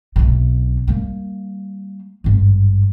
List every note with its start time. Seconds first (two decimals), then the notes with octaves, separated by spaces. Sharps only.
0.16 B1 C3
0.87 G3 A#3
2.24 G#1 G2